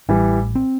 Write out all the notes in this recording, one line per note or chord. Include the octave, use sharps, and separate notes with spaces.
A1 E3 G3
C4